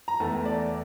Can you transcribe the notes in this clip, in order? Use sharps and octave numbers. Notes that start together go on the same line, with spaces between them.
A#5
E2 E3 A3 A5
D5